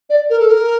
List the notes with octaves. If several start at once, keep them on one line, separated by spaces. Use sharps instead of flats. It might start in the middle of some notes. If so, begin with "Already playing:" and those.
D5
A#4
A4
A#4